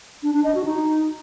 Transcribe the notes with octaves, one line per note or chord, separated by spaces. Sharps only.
D4
D4
D#5
F#4
D#4